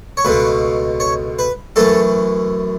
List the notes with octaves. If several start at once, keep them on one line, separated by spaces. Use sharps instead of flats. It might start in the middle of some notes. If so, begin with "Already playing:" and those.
C#5
C#2 B2 A3 B4
C#5
B4
F#2 E3 A3 A4